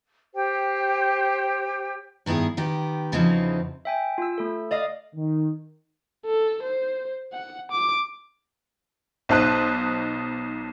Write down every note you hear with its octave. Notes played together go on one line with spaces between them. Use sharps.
G4 C5 G5
G2 D#3 B3 E4 G#4
D#3 B3 G4
E2 C#3 E3 F3 C4 D#4
E5 G5 G#5
F4 E6
A3 A4
D5 D#5 F5
D#3
A4
C5
F#5
D6
B1 D#4 C5 A5 F#6 D#7